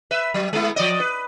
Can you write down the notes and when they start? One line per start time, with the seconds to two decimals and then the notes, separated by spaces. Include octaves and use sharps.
0.11 B4 E5
0.34 F#3
0.53 G#3 B3 E4
0.76 F3 D5 D#5
1.00 B4